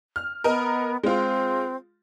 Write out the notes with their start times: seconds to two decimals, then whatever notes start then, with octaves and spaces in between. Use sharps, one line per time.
0.16 F6
0.44 B3 A#4 D#5
1.03 G#3 C4 F4